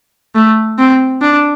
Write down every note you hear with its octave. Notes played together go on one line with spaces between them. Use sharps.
A3
C4
D4